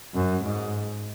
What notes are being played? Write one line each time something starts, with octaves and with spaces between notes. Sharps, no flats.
F#2
G#2